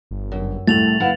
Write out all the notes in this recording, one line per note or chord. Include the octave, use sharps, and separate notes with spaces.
G1
F#2
C2 A2 A3 A6 F7 F#7
F#1 E4 B4 F5 F#5 E7